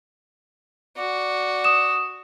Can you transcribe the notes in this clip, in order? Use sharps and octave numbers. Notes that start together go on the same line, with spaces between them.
F#4 D5
D#6 E7